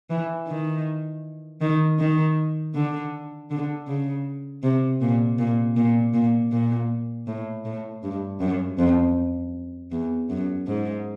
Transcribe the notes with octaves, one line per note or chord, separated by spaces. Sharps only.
E3
D#3
D#3
D#3
D3
D3
C#3
C3
A#2
A#2
A#2
A#2
A#2
A2
A2
G2
F#2
F2
E2
F#2
G#2